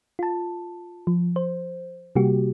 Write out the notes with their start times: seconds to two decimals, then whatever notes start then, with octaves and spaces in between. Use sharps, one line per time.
0.19 F4 A5
1.07 F3
1.36 C5
2.16 C3 G3 A#3 F#4 G4